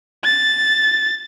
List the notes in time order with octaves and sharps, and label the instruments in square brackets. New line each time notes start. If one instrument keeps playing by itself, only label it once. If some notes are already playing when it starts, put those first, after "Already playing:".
[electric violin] A6